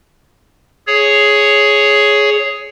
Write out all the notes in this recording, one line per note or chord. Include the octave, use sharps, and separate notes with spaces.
G#4 C#5